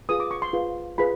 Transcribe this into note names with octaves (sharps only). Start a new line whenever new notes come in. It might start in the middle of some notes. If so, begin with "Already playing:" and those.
F4 G#4 B4 D#6
D6
C#6
C6
F4 G#4 B4
F4 G#4 B4 B5